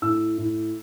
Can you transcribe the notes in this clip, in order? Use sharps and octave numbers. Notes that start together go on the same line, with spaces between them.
A2 E6
A2